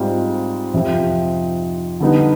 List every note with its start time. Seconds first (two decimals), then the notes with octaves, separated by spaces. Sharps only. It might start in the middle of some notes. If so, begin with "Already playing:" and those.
Already playing: G#2 G3 C4 F4
0.74 F2 C3 F3 C4
2.00 D3 G3 B3 D#4